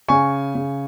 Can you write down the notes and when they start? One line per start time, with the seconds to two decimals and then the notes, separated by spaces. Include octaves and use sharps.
0.09 C#3 G#5 C#6
0.55 C#3